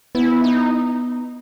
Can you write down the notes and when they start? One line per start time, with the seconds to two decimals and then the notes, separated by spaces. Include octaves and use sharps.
0.15 B3 E4
0.44 D#4